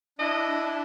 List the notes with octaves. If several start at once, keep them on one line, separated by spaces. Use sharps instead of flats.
D4 E4 D#5